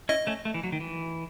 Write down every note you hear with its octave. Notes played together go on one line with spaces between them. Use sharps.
C#4 E4 D#5
A3 C#4
A3
E3
F#3
D#3
E3